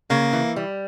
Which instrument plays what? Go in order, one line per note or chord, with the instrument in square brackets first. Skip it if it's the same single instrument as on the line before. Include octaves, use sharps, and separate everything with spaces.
[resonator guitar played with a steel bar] C#3 [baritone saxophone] A#3
[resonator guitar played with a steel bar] E3
G3